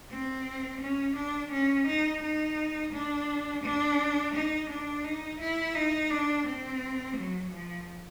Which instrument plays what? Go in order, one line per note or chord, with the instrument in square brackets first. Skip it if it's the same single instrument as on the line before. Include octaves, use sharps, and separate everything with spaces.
[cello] C4
C#4
D4
C#4
D#4
D#4
D4
D4
D#4
D4
D#4
E4
D#4
D4
C4
F#3
F3